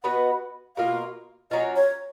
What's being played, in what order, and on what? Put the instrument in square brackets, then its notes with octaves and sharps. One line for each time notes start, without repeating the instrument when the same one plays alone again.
[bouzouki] B3 F#4 B4 D#5 [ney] F#5
[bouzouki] B2 A#3 F4 A#4 [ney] F5
[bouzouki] F#3 A#3 C#4 F4 [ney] D#5
[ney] C#5